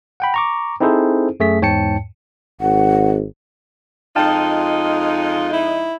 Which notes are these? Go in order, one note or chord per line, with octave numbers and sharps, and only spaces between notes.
F#5 G5 B5
A#5 C#6 D6
C4 D#4 E4 G#4 A4 C5
F#2 A3 G#4 B6
E2 G#2 C#5 G5 A5 C#7
G#1 F#5
F2 G#3 D#4 F4 G5 A5 F6
E4